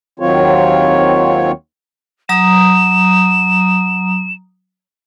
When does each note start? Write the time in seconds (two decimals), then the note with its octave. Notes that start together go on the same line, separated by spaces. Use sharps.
0.20 D#2 D#3 F#3 C4 F4 C#5
2.29 F#3 A#5 D#6 E7